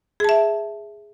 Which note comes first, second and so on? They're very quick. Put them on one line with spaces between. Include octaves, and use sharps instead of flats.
G#4 A5 E5